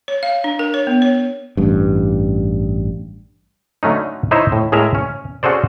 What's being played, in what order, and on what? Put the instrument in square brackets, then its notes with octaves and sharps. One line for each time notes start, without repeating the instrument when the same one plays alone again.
[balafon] C#5
F5
D4
A#4
C#5
B3
C#5
[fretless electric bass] A1 G2
[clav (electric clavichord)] D3 F#3 A3 C#4 D#4
D#4 E4 C5 C#5 D#5 E5
A2
A2 G#3 G#4 A#4 E5 A#5
C#4
C#4 F#4 G#4 A4 C5 D5